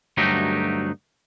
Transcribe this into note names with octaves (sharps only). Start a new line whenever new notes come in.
D2 G2 F#3 A3 D#4 G4